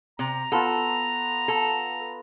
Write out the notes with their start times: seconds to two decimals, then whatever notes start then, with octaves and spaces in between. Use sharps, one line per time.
0.19 C3 A#5
0.52 B3 F4 A4
1.48 A4